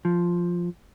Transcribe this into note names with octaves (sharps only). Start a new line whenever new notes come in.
F3